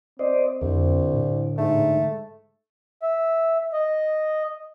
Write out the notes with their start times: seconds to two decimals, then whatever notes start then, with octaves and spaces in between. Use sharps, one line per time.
0.19 C4 C5 D5 D#5
0.62 C2 F2 D3
1.14 A2
1.58 G#2 A3
3.02 E5
3.73 D#5